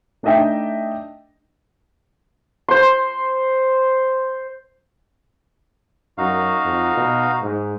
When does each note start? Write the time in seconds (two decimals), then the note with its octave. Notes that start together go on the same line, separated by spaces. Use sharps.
0.23 A3 D4 D#4 D#5 E5 G5
2.68 C5 C6
6.18 F#2 D#4 F#4 F5
6.65 F2
6.97 B2
7.42 G#2